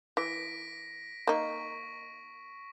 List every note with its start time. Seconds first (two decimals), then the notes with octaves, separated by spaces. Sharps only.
0.17 E3 A#6 B6 D7
1.27 A#3 D#4 C#6